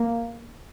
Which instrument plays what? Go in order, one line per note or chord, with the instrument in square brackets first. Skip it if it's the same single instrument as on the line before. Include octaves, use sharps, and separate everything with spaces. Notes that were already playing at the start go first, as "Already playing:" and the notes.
Already playing: [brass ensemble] A#3